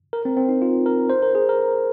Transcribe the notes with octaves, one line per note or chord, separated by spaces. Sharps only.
A#4
C4
C4
D#4
F4
A#4
C5
A#4
G#4
A#4